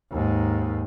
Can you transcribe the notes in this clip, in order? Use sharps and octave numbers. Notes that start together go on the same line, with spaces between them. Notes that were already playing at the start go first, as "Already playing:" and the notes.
D#2 G#2